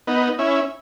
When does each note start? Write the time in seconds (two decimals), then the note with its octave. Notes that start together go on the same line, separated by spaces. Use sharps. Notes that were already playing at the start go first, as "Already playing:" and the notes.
0.07 B3 D#4
0.39 C#4 E4